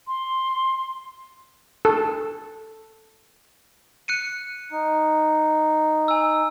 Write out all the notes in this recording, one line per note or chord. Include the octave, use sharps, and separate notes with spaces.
C6
A4
F#6 C#7 D#7
D#4
G#5 E6